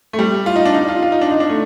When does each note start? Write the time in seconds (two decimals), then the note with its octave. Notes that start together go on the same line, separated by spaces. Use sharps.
0.13 A3
0.19 G3
0.46 F4
0.56 D#4
0.65 D4
0.74 D#4
0.89 F4
1.03 F4
1.12 D#4
1.21 D4
1.31 D#4
1.40 D4
1.50 A3